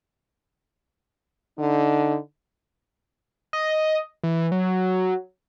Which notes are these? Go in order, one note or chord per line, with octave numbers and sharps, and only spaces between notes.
D3 D#4
D#5
E3
F#3